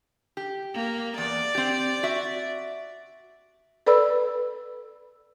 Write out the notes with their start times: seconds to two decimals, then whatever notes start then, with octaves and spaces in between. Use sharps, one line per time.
0.37 G4
0.74 A#3
1.18 E2 D5
1.55 C4 G4
2.03 F#4 E5
3.86 A4 B4 D5 B5 E6